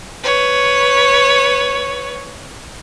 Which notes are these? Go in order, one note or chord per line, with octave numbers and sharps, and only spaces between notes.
B4 C#5